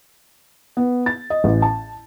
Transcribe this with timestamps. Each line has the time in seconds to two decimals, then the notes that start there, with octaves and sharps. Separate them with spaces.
0.77 B3
1.06 A6
1.30 D#5
1.44 A1
1.62 A5